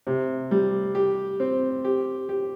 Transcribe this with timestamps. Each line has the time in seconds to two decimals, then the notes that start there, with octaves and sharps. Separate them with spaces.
0.07 C3
0.51 G3
0.95 G4
1.40 C4
1.85 G4
2.29 G4